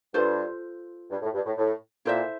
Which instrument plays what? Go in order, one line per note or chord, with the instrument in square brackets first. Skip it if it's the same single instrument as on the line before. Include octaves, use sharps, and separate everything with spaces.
[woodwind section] G2 [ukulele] F4 A4 C5
[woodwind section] G2
A2
G2
A2
A2
[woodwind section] A#2 [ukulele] E4 A4 C5 E5